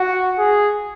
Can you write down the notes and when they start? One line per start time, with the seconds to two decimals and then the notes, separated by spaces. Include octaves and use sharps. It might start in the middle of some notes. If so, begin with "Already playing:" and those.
Already playing: F#4
0.38 G#4